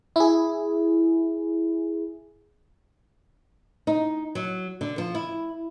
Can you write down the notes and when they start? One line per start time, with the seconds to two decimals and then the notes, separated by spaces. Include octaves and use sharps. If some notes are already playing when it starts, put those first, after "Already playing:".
0.16 E4 G#4
3.87 D#4
4.35 F#3
4.81 D3
4.98 F3
5.15 E4